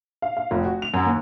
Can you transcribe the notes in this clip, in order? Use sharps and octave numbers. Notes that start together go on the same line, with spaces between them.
F5
F5
F1
F#4
F7
F#2
D#2